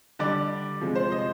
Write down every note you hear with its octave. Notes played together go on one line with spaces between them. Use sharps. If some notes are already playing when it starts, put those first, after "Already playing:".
D3 G3 D5
C3 F3 G#3
C5
D#5